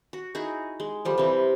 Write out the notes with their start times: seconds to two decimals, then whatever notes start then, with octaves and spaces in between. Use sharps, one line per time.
0.13 F#4
0.35 D#4 E4 F#4 G#4
0.80 G#3
1.05 D3 F3 G3
1.18 C3 E3